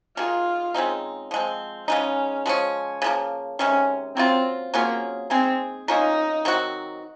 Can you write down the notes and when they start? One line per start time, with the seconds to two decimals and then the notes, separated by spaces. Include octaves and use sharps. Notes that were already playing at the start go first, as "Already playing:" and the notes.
0.17 D#3 A#3 D#4 F4 G#4
0.74 C#3 G#3 C4 D#4
1.31 F3 G#3 C4
1.88 C#3 G#3 C#4 D#4
2.46 F3 G#3 C#4
3.02 C#3 F3 A#3
3.59 C3 D#3 G#3 C#4
4.16 F#3 A#3 C4 F4
4.74 F#3 A#3 C#4 F4 G#4
5.30 G#3 C4 D#4 G#4
5.88 A#3 C#4 D#4 F4 A#4
6.45 D#3 F#3 C4 F#4